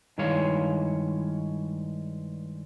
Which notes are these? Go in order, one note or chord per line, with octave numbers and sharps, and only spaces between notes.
G2 D#3 G#3 E4 C#5 F5